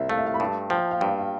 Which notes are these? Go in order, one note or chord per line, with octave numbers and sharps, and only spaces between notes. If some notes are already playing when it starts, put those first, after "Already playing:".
Already playing: C2 E5
A3 F5
E5
F5
B5
G2 A5
F3 G5
F5
G2 G5
F5